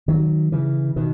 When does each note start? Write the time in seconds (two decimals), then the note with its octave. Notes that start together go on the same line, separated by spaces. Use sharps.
0.08 D#3 F#3
0.52 C#3 E3
0.96 B2 D#3